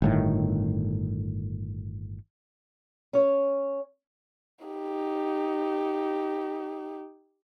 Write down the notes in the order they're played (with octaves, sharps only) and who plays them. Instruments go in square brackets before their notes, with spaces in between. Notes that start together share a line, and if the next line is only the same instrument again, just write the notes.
[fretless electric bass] G1 A2 D#3
[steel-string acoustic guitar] C#4 C#5
[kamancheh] D#4 G4